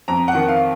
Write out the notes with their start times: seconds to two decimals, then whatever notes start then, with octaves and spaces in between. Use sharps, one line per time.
0.08 F2 A#5
0.28 F#5
0.35 D#3
0.48 F5